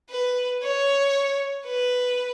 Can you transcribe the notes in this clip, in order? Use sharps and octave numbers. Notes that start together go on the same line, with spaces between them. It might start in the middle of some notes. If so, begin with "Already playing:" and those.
B4
C#5
B4